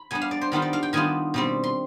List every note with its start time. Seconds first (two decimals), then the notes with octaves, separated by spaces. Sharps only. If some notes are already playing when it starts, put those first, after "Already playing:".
Already playing: B5
0.11 G3 B3 D4 G#5
0.22 F5
0.31 D5
0.41 C5
0.52 D#3 G3 B3 D4 F4
0.62 D5
0.73 F5
0.83 G5
0.93 D#3 G3 B3 D4 F4 G#5
1.34 B2 G3 C4
1.64 C6